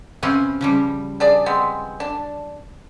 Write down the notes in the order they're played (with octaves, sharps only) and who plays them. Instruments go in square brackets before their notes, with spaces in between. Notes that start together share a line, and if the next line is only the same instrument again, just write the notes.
[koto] C3 C4 C#4 [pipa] B4 F5
[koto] C#3 F3 G3
[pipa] D4 G#4 D5
G#3 B3 C4
D4